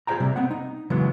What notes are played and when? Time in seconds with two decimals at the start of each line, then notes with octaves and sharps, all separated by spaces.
0.07 F4 G#4 C5 D#5 G5 A#5
0.20 C3 G3
0.36 B3 C4 F#5
0.51 D#4
0.90 C#3 E3 F#3 G#3 B3